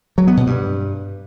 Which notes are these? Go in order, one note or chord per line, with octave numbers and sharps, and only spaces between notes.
F#3
B3
B2
G2